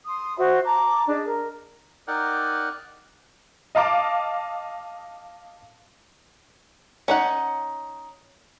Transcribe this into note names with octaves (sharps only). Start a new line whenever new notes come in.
C6 D#6
F#4 C5 E5
A5 A#5 D6
D4 G#4 D#5
A#4
D#4 A#4 D5 F#5 G5
D#5 F5 A5 D6
C#4 D#4 F#5